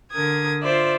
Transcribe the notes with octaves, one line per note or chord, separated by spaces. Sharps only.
D3 A#4 D#6 G#6
F4 C5 D5 E5